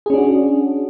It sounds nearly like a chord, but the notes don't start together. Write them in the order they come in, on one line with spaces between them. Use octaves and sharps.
G#4 C#4 D4 F#4